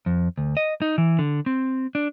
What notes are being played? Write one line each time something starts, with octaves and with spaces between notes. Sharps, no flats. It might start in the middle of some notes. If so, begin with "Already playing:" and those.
F2
D2
D#5
D#4
E3
D3
C4
D4